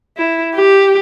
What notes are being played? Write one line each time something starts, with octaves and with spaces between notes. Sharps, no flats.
E4
G4